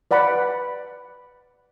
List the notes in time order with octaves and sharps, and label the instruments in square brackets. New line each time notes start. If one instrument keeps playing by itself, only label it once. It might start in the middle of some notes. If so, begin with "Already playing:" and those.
[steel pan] B4 D5 F#5 B5